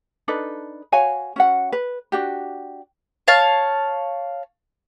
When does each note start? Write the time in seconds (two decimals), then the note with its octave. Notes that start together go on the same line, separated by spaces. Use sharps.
0.28 D4 D#4 A4 B4
0.92 F#4 C#5 F5 G#5
1.36 C#4 F#4 F#5
1.72 B4
2.12 D4 F#4 G4
3.28 C#5 F5 A5